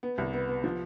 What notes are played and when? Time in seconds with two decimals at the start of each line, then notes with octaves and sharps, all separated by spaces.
0.03 B3
0.18 C2
0.33 B3
0.48 B3
0.64 F3